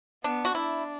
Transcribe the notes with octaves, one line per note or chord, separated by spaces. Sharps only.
B3 D4
F#4
D4 E4